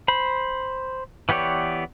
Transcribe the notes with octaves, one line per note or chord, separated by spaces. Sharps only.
C5 B5
E3 B3 G4 C#5 D5